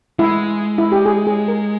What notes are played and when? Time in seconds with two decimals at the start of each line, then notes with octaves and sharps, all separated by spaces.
0.19 G#3 E4
0.78 E4
0.92 G4
1.06 G#4
1.27 G#4
1.48 A#4